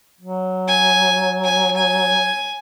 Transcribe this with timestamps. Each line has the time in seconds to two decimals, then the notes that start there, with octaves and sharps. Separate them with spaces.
0.21 F#3
0.68 G#5
1.44 G#5
1.77 G#5